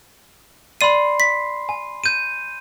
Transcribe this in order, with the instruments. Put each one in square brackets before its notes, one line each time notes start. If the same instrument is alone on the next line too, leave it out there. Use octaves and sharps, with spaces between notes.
[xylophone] D5 D#7 [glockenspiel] B5 C6 C7
[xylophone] B6
[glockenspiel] G#5
G6 D#7